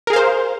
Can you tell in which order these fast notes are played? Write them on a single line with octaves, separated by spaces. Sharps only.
A#4 G#4 F5 C5